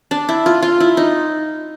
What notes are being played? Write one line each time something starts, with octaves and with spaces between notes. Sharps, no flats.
D4
E4
F4
F4
E4
D#4